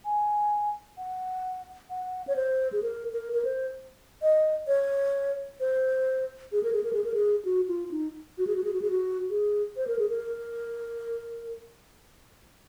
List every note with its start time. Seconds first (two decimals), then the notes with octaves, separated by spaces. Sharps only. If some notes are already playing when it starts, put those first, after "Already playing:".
0.05 G#5
0.98 F#5
1.90 F#5
2.27 C#5
2.36 C5
2.72 G#4
2.83 A#4
3.13 A#4
3.33 A#4
3.45 C5
4.22 D#5
4.67 C#5
5.60 C5
6.52 G#4
6.63 A#4
6.72 G#4
6.84 A#4
6.93 G#4
7.04 A#4
7.14 G#4
7.45 F#4
7.68 F4
7.91 D#4
8.38 F#4
8.47 G#4
8.56 F#4
8.64 G#4
8.73 F#4
8.82 G#4
8.90 F#4
9.30 G#4
9.77 C5
9.88 A#4
9.99 G#4
10.09 A#4